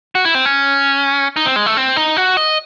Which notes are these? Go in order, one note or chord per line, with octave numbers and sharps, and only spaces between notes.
F#4
E4
C4
C#4
D#4
C4
G#3
A3
C4
D#4
F#4
D#5